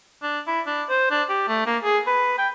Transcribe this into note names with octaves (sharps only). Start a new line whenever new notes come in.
D4
E4
D4
C5
D4
G4
A3
A#3
G#4
B4
G5